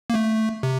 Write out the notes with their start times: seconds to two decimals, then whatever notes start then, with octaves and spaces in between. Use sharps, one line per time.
0.10 A#3
0.14 A3
0.63 C3